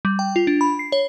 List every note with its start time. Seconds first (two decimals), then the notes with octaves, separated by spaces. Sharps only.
0.05 G3
0.19 G5
0.36 F4
0.47 D4
0.61 B5
0.79 C7
0.92 C#5